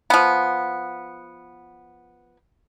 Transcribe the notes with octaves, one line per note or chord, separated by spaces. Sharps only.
F3 B3